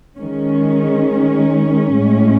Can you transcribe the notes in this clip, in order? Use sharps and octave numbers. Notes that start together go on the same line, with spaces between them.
D#3 G#3 C#4
A2 G#3